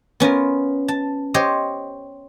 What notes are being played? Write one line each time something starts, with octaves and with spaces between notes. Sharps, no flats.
B3 C#4 F4 A#4
A5
G4 C5 C#5 D#5